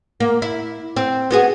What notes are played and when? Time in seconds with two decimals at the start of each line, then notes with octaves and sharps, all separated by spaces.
0.20 A#3
0.42 E4
0.96 C4
1.31 B3 F#4 G#4